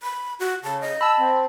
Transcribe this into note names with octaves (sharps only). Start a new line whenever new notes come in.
B5
F#4
C#3 A5
D#5
A5 B5 E6
C4